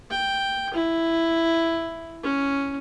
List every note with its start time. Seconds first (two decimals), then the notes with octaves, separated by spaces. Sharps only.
0.10 G5
0.73 E4
2.23 C#4